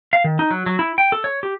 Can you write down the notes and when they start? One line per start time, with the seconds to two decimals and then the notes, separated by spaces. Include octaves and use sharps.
0.13 F5
0.24 D#3
0.39 D#4
0.51 F#3
0.66 F#3
0.79 E4
0.98 G5
1.12 A4
1.24 C#5
1.43 G4